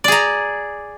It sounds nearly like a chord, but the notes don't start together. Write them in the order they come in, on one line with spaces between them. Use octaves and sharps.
D5 G#4 A#5